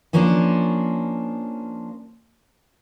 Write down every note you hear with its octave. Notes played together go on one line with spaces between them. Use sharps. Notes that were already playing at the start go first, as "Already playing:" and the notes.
F3 A#3 C#4 D4